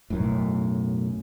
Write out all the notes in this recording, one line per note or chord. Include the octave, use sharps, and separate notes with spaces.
B1 F#2 A2